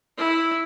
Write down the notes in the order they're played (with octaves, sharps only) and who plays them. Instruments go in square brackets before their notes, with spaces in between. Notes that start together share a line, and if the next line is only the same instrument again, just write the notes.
[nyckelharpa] E4